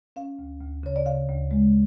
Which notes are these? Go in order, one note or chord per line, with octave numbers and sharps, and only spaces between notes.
C#4 F5
D2
D2
C#3 C#5
D5
C#3 F5
D2
G#3